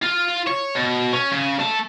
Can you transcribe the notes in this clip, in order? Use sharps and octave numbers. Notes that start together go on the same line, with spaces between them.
F4
C#5
B2
C#4
C#3
A3 A5